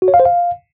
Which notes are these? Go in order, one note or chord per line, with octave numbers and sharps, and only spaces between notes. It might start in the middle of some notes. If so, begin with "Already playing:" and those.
F#4
C#5
F5
C5
F5